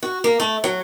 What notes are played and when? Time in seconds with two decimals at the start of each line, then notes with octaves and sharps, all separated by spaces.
0.03 F#4
0.24 A#3
0.40 A3
0.64 F#3